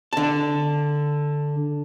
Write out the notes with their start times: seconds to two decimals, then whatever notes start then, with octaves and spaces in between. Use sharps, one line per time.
0.13 D3 A5